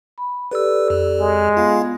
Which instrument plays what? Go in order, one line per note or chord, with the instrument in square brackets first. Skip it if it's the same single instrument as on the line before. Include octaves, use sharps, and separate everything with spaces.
[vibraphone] B5
[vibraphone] G4 A4 D5 [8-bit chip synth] B4 E6
[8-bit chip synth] F2
[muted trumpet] G#3
[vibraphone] B3 [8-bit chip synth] F4 F5